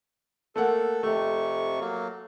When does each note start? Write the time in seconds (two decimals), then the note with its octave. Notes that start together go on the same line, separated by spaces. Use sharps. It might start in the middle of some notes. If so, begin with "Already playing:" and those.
0.56 A3 A#3 A4 F#5
1.03 F2 C3 A3 C#6
1.80 F#3 A#3